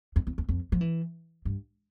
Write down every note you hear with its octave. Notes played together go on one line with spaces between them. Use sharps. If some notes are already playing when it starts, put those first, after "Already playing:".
F2
E2
E2
F2
F3
E3
G2